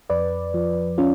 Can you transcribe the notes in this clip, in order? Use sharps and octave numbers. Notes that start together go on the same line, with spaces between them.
F2 B4 D5
F3
C#4 F4